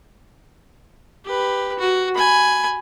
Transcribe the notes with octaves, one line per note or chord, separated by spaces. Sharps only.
G4 B4
F#4
G#5 B5